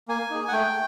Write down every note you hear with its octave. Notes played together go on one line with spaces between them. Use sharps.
A#3 G#5
D#4 G#4
F#5
A3 G5